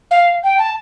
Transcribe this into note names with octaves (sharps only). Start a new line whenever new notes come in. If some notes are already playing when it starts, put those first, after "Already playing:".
F5
G5
A5